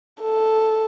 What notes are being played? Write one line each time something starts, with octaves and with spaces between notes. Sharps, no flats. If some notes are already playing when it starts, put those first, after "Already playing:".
A4